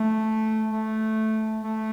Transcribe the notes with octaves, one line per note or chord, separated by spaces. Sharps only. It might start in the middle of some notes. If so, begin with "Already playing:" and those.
Already playing: A3
A3
A3